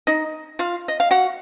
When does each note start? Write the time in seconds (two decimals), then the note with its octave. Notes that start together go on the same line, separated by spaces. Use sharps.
0.07 D#4 D#5
0.59 F4 F5
0.88 D#5
1.00 F5
1.11 F#4 F#5